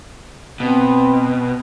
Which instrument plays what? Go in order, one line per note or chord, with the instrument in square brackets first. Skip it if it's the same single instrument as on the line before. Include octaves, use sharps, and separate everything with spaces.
[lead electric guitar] B2 [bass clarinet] C4